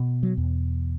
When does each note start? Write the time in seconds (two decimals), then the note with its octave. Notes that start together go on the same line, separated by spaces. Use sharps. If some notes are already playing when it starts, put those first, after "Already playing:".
Already playing: B2
0.23 F#3
0.37 E2